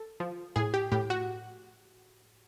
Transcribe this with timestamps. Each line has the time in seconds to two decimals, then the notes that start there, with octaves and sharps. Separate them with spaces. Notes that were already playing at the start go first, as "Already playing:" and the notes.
Already playing: A4
0.20 F3
0.56 A2 G#4
0.74 G4
0.92 A2 G4
1.10 F#4